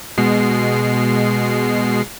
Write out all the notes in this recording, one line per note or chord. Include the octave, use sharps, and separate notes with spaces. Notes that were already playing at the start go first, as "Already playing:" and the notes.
B2 G#3 C7